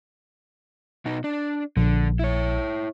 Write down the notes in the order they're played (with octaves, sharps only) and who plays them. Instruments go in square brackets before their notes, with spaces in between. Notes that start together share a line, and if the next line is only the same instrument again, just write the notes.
[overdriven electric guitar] B2 D#4
D4
[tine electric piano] A#1 [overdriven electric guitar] D3
[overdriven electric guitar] E4 C#5